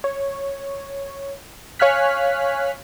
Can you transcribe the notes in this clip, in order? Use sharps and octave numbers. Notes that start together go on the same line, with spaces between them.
C#5
C#5 F5 G#5 F6 F#6 B6